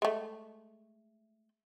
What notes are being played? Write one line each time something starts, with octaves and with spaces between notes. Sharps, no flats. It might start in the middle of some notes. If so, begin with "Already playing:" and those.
G#3 A3